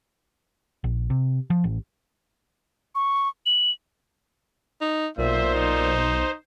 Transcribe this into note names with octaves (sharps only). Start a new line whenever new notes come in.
A#1
C3
F3
A1
C#6
F#7
D#4
B1 A#2 C5 E5
D#4